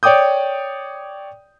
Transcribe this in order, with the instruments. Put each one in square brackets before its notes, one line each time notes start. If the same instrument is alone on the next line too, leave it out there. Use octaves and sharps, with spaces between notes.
[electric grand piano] C#5 D5 G5 D6 D#6 G6